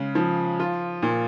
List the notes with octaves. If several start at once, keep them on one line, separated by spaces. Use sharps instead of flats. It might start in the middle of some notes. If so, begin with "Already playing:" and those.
Already playing: C#3 G#3
F3
F4
A#2